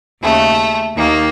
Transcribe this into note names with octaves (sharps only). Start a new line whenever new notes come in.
D#2 C#3 A3
D#2 D#3 A#3